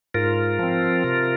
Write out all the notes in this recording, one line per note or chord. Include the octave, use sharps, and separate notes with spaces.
G#2 F4 A#4
F3 C4
C3